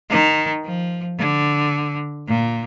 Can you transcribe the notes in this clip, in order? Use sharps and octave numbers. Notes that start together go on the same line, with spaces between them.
D#3
F3
D3
A#2